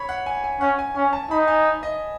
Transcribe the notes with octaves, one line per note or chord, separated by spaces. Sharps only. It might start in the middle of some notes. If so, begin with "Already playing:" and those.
Already playing: C#5 B5
F#5
G#5
G#5
C#4 F#5
G#5
C#4 G#5
A5
D#4 B5
G#5
D#5